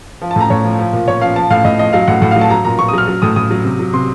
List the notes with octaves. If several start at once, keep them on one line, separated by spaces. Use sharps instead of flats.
F3
A5
A2 A#5
A2 C#5
F3
F3
A#2
A#2 C#5
F3 F5
F3 A5
A2 F5
A2 D#5
F3 D#5
F#3 F5
A2 F#5
A2 F#5
F5
F#3
A5
F#3 A#5
A#2 A#5
A#2 C#6
D#6
F#3 F6
F#3
A2 D#6
A2 D#6
F#3
C3
F#3
C3 C6